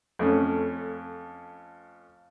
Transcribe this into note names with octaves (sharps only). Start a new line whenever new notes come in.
F2 A3 C#4